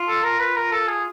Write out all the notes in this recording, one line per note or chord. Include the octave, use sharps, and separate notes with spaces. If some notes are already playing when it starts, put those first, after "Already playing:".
Already playing: F4
A4
A#4
B4
A#4
A4
G#4